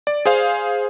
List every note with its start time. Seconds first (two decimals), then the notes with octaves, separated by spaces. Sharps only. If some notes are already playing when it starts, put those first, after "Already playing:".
0.07 D5
0.26 G#4 C5 F5